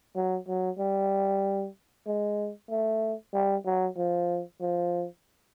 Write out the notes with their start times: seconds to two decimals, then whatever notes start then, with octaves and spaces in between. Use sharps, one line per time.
0.16 F#3
0.48 F#3
0.79 G3
2.07 G#3
2.70 A3
3.34 G3
3.66 F#3
3.97 F3
4.61 F3